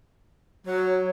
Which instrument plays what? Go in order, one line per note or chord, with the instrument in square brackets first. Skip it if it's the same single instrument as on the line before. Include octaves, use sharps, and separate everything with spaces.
[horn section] F#3 [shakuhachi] C#5